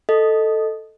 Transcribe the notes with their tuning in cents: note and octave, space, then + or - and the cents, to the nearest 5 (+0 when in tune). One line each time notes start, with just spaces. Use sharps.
A4 +0 D#5 +0